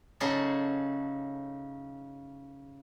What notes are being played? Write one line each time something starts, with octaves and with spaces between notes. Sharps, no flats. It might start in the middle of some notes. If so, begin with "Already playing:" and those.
C#3 F#3 D#4 G#4 A4